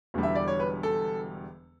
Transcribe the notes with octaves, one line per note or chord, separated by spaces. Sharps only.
E1 E2 D3 G3
E5
D5
C#5
B4
A4